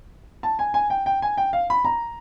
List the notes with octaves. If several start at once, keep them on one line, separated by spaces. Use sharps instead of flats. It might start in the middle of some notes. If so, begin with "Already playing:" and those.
A5
G#5
G#5
G5
G5
G#5
G5
F5
B5
A#5